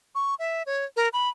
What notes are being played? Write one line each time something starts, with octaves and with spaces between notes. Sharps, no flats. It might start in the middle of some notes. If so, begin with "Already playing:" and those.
C#6
E5
C#5
A#4
B5